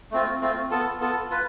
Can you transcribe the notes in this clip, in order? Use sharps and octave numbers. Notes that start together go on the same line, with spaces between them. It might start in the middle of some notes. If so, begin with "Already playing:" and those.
A3 C4 F4
A3 C4 F4
B3 F4 A4
B3 F4 A4
F4 B4